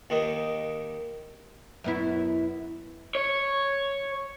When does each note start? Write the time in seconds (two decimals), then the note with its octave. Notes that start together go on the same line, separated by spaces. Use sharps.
0.10 D#2 D#3
1.84 F#2 B3 E4
3.15 C#5